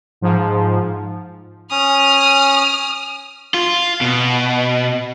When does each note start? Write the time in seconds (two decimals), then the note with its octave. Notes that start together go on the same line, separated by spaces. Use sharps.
0.21 G#2 F3
1.71 C#4 D#6 F6
3.54 F4
4.01 B2